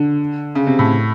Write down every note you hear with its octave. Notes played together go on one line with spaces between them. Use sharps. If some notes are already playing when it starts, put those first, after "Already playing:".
Already playing: D3
C#3
C3
A2